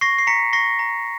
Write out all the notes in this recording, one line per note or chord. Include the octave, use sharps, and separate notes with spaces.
C#6 A#6 C7
C7
A#5 B6 C#7
C#6 A#6 C7
A#5